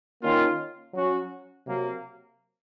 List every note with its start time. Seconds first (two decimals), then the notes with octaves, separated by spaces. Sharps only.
0.21 D#3 A#3 C#4 F4
0.93 F#3 C#4 F#4
1.65 C3 F#3 A#3